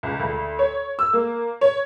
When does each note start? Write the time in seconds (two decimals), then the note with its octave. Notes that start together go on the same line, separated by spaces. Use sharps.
0.03 C#2
0.20 D2
0.59 C#5
0.99 E6
1.13 A#3
1.61 C#5